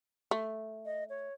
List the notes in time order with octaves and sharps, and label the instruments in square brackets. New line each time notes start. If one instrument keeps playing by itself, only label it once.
[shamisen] A3
[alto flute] D#5
C#5